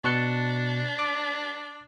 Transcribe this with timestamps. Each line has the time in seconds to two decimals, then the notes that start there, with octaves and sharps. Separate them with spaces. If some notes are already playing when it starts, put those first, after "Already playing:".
0.04 B2 D4 A5 C#6 F#6 C#7 G7
0.99 D6